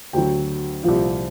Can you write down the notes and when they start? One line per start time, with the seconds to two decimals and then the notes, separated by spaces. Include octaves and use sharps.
0.13 D2 D3 F#3 G5
0.84 C2 A#2 F3